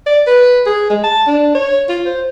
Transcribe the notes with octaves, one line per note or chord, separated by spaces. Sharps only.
D5
B4
G#4
G#3
A5
D4
C#5
F4
C5